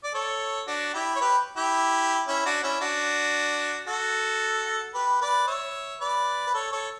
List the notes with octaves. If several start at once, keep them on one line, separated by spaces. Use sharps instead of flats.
D5
A4 C#5
D4 F#4
E4 G4
C#5
G4 B4
E4 G4
C#4 E4
D4 F#4
C#4 E4
D4 F#4
F#4 A4
G4 B4
B4 D5
C#5 E5
B4 D5
B4
A4 C#5
A4 C#5